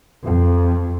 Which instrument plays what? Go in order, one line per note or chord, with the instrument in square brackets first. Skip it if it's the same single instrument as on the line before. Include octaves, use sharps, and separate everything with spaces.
[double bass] F2